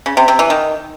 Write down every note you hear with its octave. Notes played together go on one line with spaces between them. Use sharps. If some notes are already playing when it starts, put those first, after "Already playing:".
C#3
C3
C3
E3
D#3